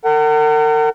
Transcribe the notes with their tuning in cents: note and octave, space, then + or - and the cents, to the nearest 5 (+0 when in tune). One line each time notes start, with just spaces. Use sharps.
A#4 -40 F#5 +35